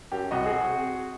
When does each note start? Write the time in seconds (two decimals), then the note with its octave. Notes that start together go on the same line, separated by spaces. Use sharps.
0.12 F#2 G4
0.31 C2 F#4 D#5
0.44 C4 G#4